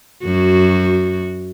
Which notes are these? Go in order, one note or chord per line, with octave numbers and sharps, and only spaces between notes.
F#2 F#4